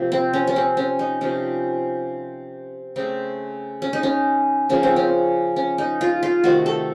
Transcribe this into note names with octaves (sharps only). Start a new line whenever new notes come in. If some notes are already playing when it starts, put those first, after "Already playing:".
Already playing: C3 F3 A#3
C4
C#4
C#4
C4
C#4
D#4
C3 F3 A#3 C#4
C#3 A3 C4
C#4
D#4
C#4
C#3 F3 A#3 C#4
C4
C#4
C#4
D#4
F4
F4
C3 D#3 A3 F#4
A4